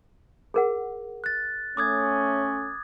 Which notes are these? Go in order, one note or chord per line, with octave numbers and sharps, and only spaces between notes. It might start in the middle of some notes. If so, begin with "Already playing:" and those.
G#4 A#4 F#5
F#6 A6
A3 C#4 D6 D#6 G#6